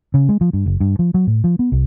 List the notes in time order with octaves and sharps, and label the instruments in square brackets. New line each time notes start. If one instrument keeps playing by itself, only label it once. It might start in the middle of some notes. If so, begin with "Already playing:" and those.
[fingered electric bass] C#3
G#3
F3
G2
F#1
G2
F3
F#3
A2
F3
B3
C2